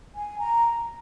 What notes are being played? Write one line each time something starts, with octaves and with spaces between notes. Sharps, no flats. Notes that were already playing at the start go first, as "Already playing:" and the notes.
G#5
A#5